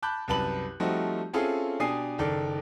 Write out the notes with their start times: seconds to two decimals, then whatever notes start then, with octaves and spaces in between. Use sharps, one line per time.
0.02 A5 B5 D6 F#6 G6
0.28 C2 F#2 B4 A5 B5 F#7
0.80 F3 G3 A3 C4 D#4 F#4
1.33 C4 C#4 E4 F4 G#4 A4
1.80 B2 D4 G4 G#5 D#6 C7
2.18 F#1 D#3 A4 D5